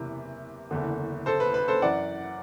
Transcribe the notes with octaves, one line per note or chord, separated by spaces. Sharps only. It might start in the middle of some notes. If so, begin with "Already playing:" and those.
Already playing: F#1 E2 C3 E3
F#1 E2 D3
A4 C5
B4
B4
A4 C5
F#2 E3 D5 F#5